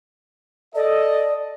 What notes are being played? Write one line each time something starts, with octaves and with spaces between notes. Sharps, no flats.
A4 D5 D#5